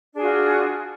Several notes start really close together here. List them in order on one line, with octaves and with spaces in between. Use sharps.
D4 G#4 F#4 F4